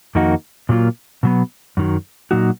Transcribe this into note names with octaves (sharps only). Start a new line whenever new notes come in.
F2 D#3 A#3 D#4 F#4
A#2 F#3 A#3 F4
B2 F#3 B3
F#2 D#3 F#3
A#2 F#3 A#3 D#4 F#4